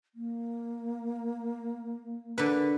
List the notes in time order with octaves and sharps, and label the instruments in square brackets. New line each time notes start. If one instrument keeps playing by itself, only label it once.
[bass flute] A#3
[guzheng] D3 B4